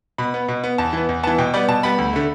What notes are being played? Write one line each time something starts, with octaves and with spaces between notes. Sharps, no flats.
B2 B5
B3
B2
B3
E2 A5
E3 B3
E2
E3 B3 A5
B2 G5
G3 B3 D5
B2 A5
G3 B3 B5
D2
D3 A3